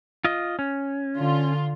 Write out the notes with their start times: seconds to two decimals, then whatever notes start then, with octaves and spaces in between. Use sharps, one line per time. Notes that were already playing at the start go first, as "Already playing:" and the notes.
0.24 F4 D#5
0.59 C#4
1.17 D3 F4